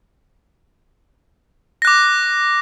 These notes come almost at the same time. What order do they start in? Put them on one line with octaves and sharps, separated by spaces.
A#6 F#6 D6